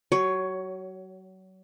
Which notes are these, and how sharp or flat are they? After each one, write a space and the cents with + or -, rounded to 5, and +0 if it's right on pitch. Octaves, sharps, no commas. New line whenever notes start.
F#3 +30 C#5 +10